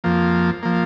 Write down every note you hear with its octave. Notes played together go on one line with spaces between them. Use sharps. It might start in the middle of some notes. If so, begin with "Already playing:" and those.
F2 F3 A#3
F3 A#3